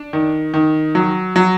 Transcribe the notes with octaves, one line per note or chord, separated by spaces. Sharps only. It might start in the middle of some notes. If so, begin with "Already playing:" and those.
Already playing: D4
D#3
D#3
F#3
F#3